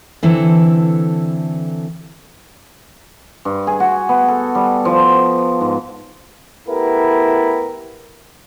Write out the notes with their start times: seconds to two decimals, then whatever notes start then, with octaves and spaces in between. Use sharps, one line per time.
0.23 D3 E3 C4 E4 A4
3.45 G2
3.67 G#4
3.80 F#4
4.09 B3
4.28 A4
4.55 G3
4.85 F3
5.60 G#2
6.68 A3 B3 E4 G4 A#4